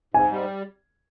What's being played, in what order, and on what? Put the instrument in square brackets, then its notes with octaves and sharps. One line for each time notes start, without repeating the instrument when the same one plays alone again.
[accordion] G#2 [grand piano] G#5
[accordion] G3